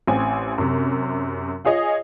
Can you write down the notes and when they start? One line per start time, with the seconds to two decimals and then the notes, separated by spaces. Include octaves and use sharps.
0.07 A1 C4 G#5
0.58 F#2 C3
1.65 F4 G#4 C#5 D#5